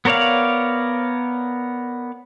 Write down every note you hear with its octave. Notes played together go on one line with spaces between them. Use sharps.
B3 A#4 C#5 D5 F5